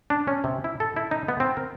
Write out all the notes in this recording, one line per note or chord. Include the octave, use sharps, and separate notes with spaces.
D4
C#4
C3
E4
A4
E4
D#4
B3
C4
A#4